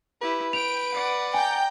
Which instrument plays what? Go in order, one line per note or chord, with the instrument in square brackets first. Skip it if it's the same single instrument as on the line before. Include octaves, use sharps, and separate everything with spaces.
[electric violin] E4 G4 [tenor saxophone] B4
[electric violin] G5 [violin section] D7 [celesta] F7
[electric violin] D5 F#5
[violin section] G5 A#5 G6 [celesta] G#5